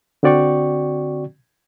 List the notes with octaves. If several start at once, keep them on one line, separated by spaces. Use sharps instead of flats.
D3 C4 F#4 D5 G5 C#6